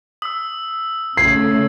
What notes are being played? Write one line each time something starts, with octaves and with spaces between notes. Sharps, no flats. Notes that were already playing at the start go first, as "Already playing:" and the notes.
D#6 E6
C#3 A3 G#6 C7